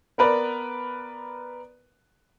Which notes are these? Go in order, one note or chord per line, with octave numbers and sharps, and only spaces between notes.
B3 A#4 B4 D5